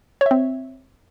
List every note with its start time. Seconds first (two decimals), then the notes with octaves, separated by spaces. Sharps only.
0.21 C#5
0.26 E5
0.31 C4